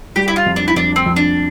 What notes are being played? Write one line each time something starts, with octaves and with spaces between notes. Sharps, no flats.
G3 G4
E4
F4
F2
D4
E4
F2 D4
C4
F2
D4